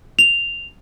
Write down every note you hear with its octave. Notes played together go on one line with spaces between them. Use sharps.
F7